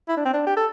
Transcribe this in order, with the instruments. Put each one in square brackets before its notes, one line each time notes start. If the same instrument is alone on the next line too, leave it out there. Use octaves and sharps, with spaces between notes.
[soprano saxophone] E4
D4
C4
D4
G4
A4